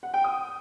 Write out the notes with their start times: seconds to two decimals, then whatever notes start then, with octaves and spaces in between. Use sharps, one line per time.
0.03 F#5
0.14 G5
0.24 D#6